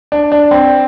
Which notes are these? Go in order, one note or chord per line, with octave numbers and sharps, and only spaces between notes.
D4
D4
C4